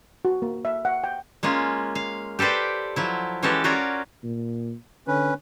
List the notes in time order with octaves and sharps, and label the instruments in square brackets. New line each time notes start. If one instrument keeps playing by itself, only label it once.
[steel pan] F#4
A#3
E5
F#5
G5
[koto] G#3 A#3 C#4 F4
F5
G4 A4 B4 C5 D5
F3 F#3 E4
E3 G#3 C#4 F#4 G4 A4
C#4 F4 F#4 A#4 C#5 D5
[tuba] A#2
[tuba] D3 [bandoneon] C#4 B4